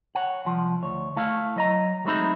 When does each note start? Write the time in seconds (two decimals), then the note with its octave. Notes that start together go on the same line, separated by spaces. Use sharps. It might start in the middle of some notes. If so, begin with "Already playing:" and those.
0.15 C#5 F#5
0.45 C2 F3
0.83 D2 C#5
1.16 A3 E4 F5
1.56 F#3 D#5 A#5
2.05 F#3 G#3 A3 C4 D#4 E4